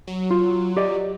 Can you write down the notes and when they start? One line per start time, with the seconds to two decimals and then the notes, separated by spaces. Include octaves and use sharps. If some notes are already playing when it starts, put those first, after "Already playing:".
0.07 F#3
0.31 F4
0.77 G4 D5 D#5